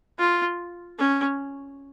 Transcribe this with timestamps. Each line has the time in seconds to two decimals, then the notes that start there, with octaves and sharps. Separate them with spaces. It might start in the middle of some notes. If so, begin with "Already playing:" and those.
0.19 F4
0.99 C#4